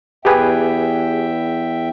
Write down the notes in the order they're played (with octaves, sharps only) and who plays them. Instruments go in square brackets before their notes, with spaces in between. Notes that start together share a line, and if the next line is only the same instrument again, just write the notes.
[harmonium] E2 E5 G5 [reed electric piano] G4 G#4 B4